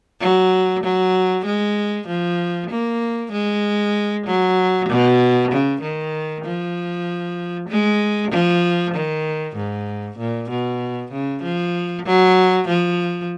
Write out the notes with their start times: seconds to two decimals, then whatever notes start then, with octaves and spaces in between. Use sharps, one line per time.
0.21 F#3
0.83 F#3
1.45 G#3
2.08 F3
2.70 A#3
3.32 G#3
4.26 F#3
4.89 B2
5.51 C#3
5.82 D#3
6.45 F3
7.69 G#3
8.31 F3
8.94 D#3
9.56 G#2
10.18 A#2
10.50 B2
11.12 C#3
11.43 F3
12.06 F#3
12.68 F3